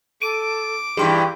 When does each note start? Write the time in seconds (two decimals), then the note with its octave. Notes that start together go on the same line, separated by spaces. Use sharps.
0.22 A4 D6 D7 D#7
0.97 G2 E3 G4 G#4 C6